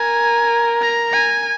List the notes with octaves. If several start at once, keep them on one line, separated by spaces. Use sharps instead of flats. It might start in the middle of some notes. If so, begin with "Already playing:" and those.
Already playing: A#4 G#5
A#5
G#5